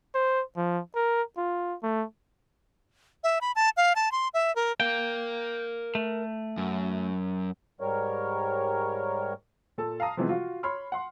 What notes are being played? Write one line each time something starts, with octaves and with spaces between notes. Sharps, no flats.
C5
F3
A#4
F4
A3
E5
B5
A5
F5
A5
C6
E5
A#4
A#4 F5 G5
A3
F#2
G#2 G3 A#4 C#5
A#2 A4 A5
F5 A5 A#5 D#6
C3 E3 F3 G3 G#3 B3
F4 F#4 F5
C#5 B5 C6 F6
F#5 C6